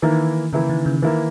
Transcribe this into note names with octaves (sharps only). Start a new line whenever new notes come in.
D#3 E3 A#3 E4 A#4
C#3 E3 A#3 E4 A#4
D#3
C#3
D#3 E3 A#3 E4 A#4